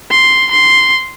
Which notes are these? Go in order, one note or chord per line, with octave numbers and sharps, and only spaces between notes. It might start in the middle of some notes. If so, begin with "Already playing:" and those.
C6
C6